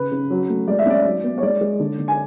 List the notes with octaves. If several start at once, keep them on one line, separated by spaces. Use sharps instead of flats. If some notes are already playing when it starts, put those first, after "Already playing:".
Already playing: C#3 B4
C#3
F#3
A3
G#3 D5
E5
C#4 D5
F#3
B3
C#5
G#3 D5
G#3
D3
D3
G#5